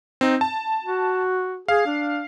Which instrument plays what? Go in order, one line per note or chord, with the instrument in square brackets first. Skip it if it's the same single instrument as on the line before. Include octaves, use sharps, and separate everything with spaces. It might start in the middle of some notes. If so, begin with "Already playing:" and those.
[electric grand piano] C4 D#4
A5
[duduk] F#4
[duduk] G#4 [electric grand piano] F5
[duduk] D4